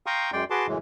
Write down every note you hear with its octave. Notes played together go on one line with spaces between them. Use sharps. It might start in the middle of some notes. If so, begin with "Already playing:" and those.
F5 G5 A#5 C6 C#6 D#6
F#2 G#3 D5 G5 C6
F#4 G#4 B4 A5 C6 D6
F#2 A2 C#3 E3 G#3